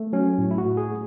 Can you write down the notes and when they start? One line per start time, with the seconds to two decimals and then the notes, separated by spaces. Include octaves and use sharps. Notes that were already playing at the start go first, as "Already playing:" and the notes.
Already playing: A3
0.13 F#3 C#4
0.38 A2
0.51 E4
0.58 F#4
0.65 A2
0.77 G#4
0.91 A3